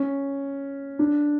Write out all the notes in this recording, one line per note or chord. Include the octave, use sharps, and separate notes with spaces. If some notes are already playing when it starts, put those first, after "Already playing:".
Already playing: C#4
D4